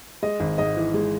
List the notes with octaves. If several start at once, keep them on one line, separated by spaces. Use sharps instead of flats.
G#3 D#5
G#1
G#2 D#5
E3
G#3